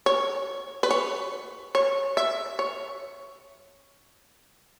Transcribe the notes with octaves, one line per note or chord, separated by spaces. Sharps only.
C#5
B4
C#5
C#5
E5
C#5